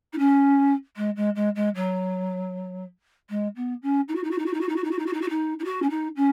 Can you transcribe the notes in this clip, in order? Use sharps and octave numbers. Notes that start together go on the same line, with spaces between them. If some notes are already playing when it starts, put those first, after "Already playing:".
D#4
C#4
G#3
G#3
G#3
G#3
F#3
G#3
B3
C#4
D#4
F#4
D#4
F#4
D#4
F#4
D#4
F#4
D#4
F#4
D#4
F#4
D#4
F#4
D#4
F#4
D#4
D#4
F#4
C#4
D#4
C#4